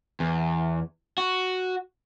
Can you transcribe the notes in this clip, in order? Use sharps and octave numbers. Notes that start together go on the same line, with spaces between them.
E2
F#4